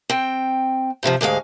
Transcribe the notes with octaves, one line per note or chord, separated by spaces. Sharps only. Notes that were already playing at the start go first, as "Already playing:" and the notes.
C4 G5
G2 C3 D#3 F3
D2 G#2 G#3 F5